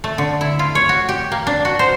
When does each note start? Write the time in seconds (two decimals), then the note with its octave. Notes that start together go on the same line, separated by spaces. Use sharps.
0.04 A3
0.18 D3
0.41 E4
0.59 F4
0.75 C#5
0.89 F#4
1.09 G4
1.32 A#3
1.47 D4
1.65 F#4
1.79 C5